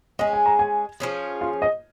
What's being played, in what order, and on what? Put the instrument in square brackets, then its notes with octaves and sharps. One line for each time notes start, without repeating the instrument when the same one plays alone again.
[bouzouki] G#3 C#4 G#4 [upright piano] D#5
[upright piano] G#5
A#5
G#5
[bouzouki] F3 C#4 G#4
[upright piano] F4
D#5